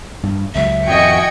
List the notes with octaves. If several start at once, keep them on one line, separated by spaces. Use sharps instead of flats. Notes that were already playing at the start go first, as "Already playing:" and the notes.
G2
C#2 F#3 E5
F2 A2 D#3 F#4 D#5 G5 G#5 C#7